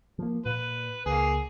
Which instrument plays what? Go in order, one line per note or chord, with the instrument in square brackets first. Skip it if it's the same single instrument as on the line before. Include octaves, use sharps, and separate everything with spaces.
[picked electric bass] F3 A#3
[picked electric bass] A#2 [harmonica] B4
[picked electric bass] C#2 [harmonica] A#3 G#4